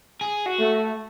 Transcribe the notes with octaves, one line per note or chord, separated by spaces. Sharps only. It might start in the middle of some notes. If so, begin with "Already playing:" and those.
G#4
F#4
A3